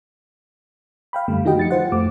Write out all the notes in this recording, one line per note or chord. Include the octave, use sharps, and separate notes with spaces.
F5 G5 B5
F#2 D3 G3 A3
D#3 D#4 F#4 G4 D#5 G5
F3 A6 C#7
F4 C5 F#5
F2 A3 D6